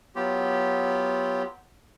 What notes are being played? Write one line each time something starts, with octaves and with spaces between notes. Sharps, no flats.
F#3 B3 F4 G4